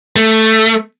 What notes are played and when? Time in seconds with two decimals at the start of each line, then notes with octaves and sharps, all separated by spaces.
0.16 A3